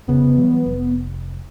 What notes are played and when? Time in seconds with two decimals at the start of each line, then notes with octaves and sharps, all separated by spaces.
0.08 F1 C#3 B3
0.37 E3 F#3 G3
0.66 F1